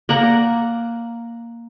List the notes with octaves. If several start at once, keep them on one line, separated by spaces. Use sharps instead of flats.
A#3 D5 F#5 A#5